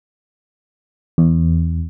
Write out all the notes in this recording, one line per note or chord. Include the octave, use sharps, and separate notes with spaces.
E2